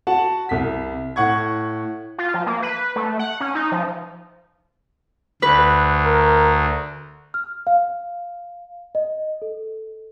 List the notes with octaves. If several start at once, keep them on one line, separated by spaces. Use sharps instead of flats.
F#4 F#5 A5
C2 B6
A2 F#5 C#6 G#6
F4
F3
A#3
B4
A3
F#5
C#4
D#4
F3
D2 B4
A#4
F6
F5
D#5
A4